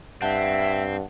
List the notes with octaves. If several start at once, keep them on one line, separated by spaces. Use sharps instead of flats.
G2 C4 E5 F#5 A5